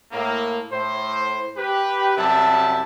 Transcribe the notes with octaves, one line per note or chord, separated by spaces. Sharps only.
A2 A#3
A2 C5
G4 B4
F#2 C3 G3 E4 A5